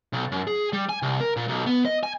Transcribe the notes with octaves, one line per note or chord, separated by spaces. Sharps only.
B1
F#2
G#4
G3
G#5
C2
A#4
A#2
B1
B3
D#5
G#5